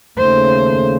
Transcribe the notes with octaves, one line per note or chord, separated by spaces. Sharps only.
D#2 C#3 A3 C5